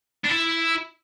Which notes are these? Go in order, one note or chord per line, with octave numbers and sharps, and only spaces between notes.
D4
E4